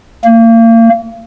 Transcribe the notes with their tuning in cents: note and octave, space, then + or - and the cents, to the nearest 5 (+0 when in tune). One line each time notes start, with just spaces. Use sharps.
A#3 -35